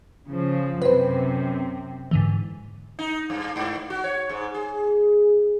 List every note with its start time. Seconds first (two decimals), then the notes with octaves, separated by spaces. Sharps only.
0.28 C#3 F3
0.82 F#2 C3 B4 C5
2.11 G#2 D3 E3
2.99 D#4
3.30 G2
3.56 G#2
3.90 F#4
4.04 C#5
4.30 G#2
4.54 G#4